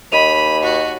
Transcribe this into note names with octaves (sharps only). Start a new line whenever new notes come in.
D#2 D#5 B5 D#7 F7
F#4